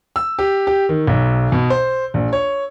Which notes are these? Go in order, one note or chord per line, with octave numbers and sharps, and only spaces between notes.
E6
G4
G4
D#3
B1
B2
C5
A#1
C#5